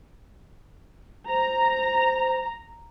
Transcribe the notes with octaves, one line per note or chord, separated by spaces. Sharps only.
C5 A#5